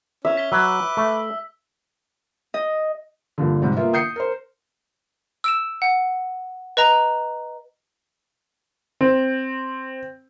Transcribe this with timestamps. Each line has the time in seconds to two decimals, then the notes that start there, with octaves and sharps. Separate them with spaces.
0.25 C#4 E5
0.37 B6 G7
0.52 F#3 B4 D6 E6
0.97 A3
2.54 D#5
3.38 G2 A#2 D3
3.62 G#2 C3 G3
3.77 A#3 B3 F4 E5
3.93 D#6 G6 C7 C#7
4.16 A#4 C5
5.44 E6 D7 E7
5.82 F#5
6.77 B4 D#5 A#5
9.01 C4